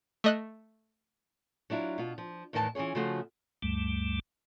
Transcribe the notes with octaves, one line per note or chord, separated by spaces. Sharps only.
A3 D#5 F#6
F#3 D4 E4 F4
B2 F4
F3
E2 A2 D#3 E3 A#4 A5
E3 C#4 F4 G#4 C#5
C#3 F3 A3 F4 F#4
D2 G2 G3 A3